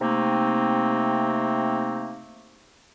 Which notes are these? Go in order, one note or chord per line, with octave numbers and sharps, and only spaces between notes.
C3 A3 A#3 C4 D#4